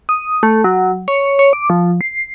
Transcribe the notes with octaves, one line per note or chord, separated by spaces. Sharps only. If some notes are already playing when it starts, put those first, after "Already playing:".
D#6
A3
F#3
C#5
C#5
D6
F3
C7